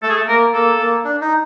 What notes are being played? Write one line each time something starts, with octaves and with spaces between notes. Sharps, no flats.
A3 A4
G#4
A4
A#3 A#4
A#3 A4
A#3
D4
D#4